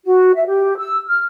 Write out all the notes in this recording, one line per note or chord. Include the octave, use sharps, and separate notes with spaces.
F#4
E5
G4
E6
F6